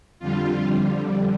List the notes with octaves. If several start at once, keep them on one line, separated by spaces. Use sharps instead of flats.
F2 D3 G3 F4